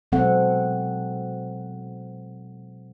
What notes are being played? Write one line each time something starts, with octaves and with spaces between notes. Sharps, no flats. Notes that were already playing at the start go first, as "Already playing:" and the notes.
B2 F#3 G#3 C4 A4 F#5